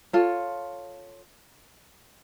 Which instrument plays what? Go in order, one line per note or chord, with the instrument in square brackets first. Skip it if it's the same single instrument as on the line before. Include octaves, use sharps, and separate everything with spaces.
[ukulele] F4 A4 C#5